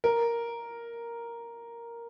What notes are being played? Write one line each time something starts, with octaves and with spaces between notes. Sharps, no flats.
A#4